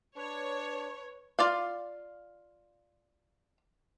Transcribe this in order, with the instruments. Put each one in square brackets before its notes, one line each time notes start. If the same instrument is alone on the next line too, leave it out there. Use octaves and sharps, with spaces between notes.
[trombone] D4 [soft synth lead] B4 [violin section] C#5
[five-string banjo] F4 D5 F5